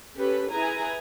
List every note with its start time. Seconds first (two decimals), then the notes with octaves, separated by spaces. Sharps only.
0.16 C#4 G4 A4 B4
0.50 E4 G#4 B4 G#5 A#5